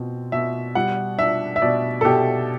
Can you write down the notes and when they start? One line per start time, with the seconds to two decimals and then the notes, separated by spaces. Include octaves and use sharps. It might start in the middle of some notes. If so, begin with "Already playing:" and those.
Already playing: B2 C4
0.32 B2 E5
0.75 G3 F#5
1.18 D4 E5
1.56 E5
1.62 B2 D5
2.01 A4
2.05 B2 G4